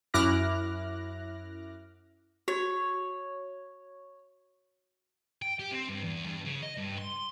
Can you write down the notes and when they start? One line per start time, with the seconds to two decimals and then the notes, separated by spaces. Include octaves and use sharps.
0.14 F#2 E4 D6 F6 F#6 A#6
2.48 F#4 C#5
5.42 G5
5.59 G4
5.72 C4
5.89 G2
6.03 E2
6.26 G2
6.45 C#3
6.62 D#5
6.77 G2
6.98 C6